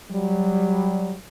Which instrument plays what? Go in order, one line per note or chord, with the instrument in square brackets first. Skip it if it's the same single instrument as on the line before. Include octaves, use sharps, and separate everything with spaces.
[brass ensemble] F#3 G3